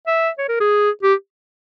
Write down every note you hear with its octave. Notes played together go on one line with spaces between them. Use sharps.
E5
C#5
A#4
G#4
G4